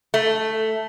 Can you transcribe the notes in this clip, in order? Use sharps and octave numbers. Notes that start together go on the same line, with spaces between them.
A3